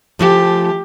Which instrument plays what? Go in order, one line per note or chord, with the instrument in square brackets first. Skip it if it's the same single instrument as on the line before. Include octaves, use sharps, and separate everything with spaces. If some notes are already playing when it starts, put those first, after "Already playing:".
[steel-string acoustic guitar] C#3 F3 A3 [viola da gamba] G4